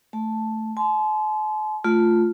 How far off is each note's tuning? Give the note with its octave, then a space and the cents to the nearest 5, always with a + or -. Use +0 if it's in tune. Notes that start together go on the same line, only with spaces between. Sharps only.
A3 +0 A5 +0
A5 -45 C6 -20
A3 +0 F4 +0